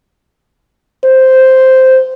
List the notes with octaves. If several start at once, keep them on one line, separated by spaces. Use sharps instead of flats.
C5